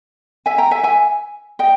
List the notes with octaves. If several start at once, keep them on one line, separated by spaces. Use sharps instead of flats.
E5 G#5
G5 A#5
E5 G#5
E5 G#5
D#5 G5